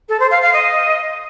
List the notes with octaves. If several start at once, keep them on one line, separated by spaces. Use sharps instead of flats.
A4
C5
F5
F5
D#5